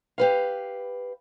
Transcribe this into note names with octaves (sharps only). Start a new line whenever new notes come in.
G4 B4 F5